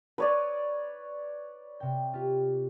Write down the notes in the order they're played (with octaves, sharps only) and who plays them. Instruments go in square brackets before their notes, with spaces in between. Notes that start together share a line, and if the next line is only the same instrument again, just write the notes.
[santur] B4 C#5 D5 [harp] A#5 D#6 G#6
[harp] C3 G5
F4 G4